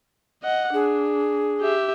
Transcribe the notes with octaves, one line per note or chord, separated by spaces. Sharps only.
D#5 F#5
D4 G#4
G4 E5